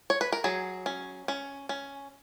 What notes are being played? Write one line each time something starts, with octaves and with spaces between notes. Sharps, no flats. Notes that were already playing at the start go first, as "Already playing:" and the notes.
C#5
B4
A#4
F#3 G#4
C#4
C#4
C#4